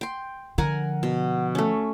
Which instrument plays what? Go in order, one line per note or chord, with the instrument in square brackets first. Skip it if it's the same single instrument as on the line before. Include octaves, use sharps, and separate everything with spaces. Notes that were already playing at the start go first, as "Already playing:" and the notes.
[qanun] G5 C6
[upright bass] D3 F3 [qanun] A#4 F#5 G#5
[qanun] B2
A3 C#4